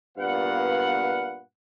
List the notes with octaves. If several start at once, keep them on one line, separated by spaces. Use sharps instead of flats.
G2 A#2 B3 B4 F5 F#5